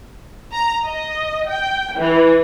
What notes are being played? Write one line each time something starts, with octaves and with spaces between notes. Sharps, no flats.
A#5
D#5
G5
E3